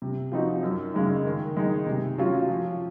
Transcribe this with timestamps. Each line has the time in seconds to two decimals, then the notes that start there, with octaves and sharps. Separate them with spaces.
0.02 C3
0.32 F3 C4 D#4 F#4
0.63 F#2
0.94 C#3 G#3 D#4
1.25 D#3
1.57 G#3 D#4
1.86 C3
2.18 F#3 C#4 F4
2.49 F3